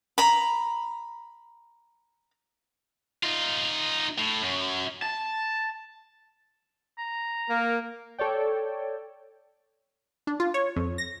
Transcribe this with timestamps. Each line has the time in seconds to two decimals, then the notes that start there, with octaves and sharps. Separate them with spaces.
0.18 A#5 B5
3.23 D#4 F4
4.18 A2
4.43 F#2
5.02 A5
6.98 A#5
7.49 A#3 A#4
8.18 A4 C#5 D5 G5
10.27 D4
10.40 F4
10.54 C#5
10.76 F2
10.98 A#6